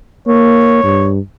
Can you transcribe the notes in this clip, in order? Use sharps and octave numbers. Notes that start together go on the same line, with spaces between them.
A#3 C#5
G2